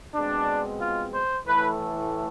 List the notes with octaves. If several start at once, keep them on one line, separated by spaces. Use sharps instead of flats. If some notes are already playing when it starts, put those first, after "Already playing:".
B2 G#3 C4 D4
F4
C5
A2 E3 A3 B4